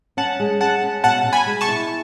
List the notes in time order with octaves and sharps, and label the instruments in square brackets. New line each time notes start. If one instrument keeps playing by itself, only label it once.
[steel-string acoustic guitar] C#4 [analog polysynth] F#5 A5
[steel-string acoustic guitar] G#3
[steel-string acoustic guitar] G#3 [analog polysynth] F#5 A5
[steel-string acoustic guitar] C#4
[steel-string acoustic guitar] B2 [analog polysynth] F#5 A5
[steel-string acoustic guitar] B2
[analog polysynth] G#5 B5
[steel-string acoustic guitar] G#3
[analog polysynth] A5 C#6
[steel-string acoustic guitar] E4